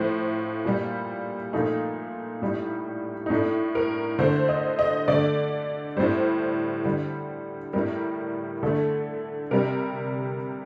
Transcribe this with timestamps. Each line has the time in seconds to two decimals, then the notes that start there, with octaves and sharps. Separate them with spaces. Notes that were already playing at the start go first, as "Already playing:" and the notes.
Already playing: A2 F3 A3 C5
0.65 A#2 G3
1.53 A#2 F3 A3 D#4
2.42 A2 G3
3.26 D#4
3.30 A2 A3 D4
3.75 A#4
4.19 D3 A3 C5
4.49 D#5
4.79 D#5
5.08 D3 A3 D5
5.97 A2 G3 C5
6.85 D3 G3
7.73 A2 G3 A#4
8.63 D3 A3 A4
9.51 C3 G3 A#4